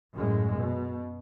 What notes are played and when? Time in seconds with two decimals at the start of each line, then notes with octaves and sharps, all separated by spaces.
0.14 F#2 A2 G#3
0.58 B2